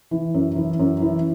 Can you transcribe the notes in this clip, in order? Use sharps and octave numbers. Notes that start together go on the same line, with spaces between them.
E3
F#2
E3
F#2
E3